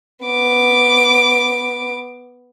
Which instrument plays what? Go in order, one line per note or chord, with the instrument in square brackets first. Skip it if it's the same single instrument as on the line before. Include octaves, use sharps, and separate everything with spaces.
[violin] B3 D6